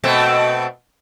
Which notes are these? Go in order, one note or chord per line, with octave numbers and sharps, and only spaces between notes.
B2 A3 C4